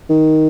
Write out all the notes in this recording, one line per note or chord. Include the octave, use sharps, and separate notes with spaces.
D#3